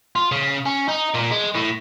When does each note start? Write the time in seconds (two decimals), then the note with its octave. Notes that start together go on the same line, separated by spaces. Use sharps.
0.16 F4
0.32 C#3
0.66 C#4
0.89 D#4
1.15 A#2
1.32 G#3
1.55 A2